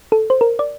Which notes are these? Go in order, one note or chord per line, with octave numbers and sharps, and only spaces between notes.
A4
C5
A#4
D5